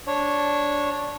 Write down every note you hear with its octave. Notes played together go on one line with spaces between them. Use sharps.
D4 C#5